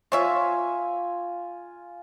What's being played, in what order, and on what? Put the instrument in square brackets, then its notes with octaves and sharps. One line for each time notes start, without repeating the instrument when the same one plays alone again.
[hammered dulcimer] F4 G#5 [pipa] C5 C#5 E5